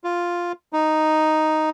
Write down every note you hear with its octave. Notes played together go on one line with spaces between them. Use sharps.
F4
D#4